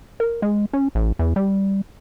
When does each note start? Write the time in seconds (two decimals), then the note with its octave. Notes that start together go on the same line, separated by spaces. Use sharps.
0.20 A#4
0.42 G#3
0.73 C#4
0.95 A1
1.19 E2
1.36 G3